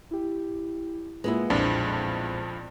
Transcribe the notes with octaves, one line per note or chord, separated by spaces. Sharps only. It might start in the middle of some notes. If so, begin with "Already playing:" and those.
E4 G4
G#3 A#3 B3 E4 F4 B4
B1 F2 A#2 F3 D4